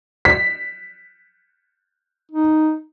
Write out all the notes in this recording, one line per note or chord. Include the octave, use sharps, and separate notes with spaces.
B6
D#4